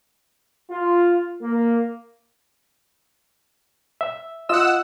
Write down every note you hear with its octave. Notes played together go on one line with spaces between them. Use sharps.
F4
A#3
E5
F4 D#5 F#5 E6